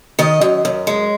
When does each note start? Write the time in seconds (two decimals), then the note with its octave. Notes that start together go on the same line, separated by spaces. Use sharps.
0.19 D#3 D#5
0.41 F#2
0.65 F#2
0.87 G#3